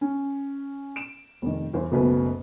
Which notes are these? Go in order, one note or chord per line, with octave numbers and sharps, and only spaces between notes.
C#4
D7 E7
F1 D#3
E2 E4 C5
F#1 B1 F#2 A3 B3 B4